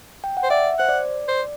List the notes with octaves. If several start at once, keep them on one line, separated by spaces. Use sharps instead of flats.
G5
F#5
C5
D5 E5
C5 F#5
D5
C5